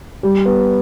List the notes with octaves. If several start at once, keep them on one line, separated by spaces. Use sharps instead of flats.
G3
B3